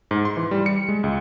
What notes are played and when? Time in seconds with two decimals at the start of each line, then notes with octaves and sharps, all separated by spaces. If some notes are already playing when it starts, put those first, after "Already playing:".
0.11 G#2
0.25 C6
0.37 E3
0.51 G3
0.66 C#7
0.89 G#3
1.04 C#2